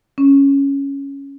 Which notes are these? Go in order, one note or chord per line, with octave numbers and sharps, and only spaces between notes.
C#4